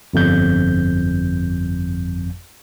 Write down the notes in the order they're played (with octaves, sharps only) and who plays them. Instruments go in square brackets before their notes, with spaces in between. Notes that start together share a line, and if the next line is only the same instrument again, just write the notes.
[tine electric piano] G1 F2 G6